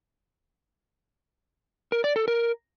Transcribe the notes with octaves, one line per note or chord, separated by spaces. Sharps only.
A#4
D5
A4
A#4